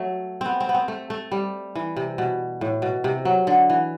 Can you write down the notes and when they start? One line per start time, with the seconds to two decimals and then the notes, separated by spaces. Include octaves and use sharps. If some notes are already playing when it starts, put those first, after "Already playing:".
Already playing: F#3 A3
0.41 B3 C4
0.60 C4
0.69 B3
0.74 C4
0.88 A3
1.10 A3
1.32 G3
1.75 E3
1.97 C3
2.18 B2
2.61 A2
2.82 B2
3.04 C3
3.25 F#3
3.47 D3
3.70 E3